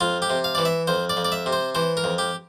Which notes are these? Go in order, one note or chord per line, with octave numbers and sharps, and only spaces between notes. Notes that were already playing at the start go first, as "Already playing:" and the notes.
F2 F4
G4
C3
F5
E3 D5
E5
F2 C5
D5
F2
D5
E5
C3
C5
E3 C5
A#4
F2
G4